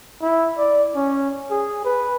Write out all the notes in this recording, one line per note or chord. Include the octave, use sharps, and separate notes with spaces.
E4
D5
C#4
G#4
B4